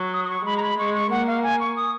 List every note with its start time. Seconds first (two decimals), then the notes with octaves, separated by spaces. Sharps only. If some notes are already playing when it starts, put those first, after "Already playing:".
Already playing: F#3
0.13 D#6
0.24 D#6
0.30 C#6
0.45 G#3 B5
0.57 A#5
0.62 B5
0.78 G#3 C#6
0.95 C#6
1.11 A#3 F#5
1.27 F5
1.43 G#5
1.60 C#6
1.76 D#6